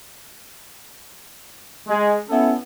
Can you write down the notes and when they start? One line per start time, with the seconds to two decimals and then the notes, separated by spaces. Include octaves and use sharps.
1.88 G#3
2.29 B3 C#4 E4 A4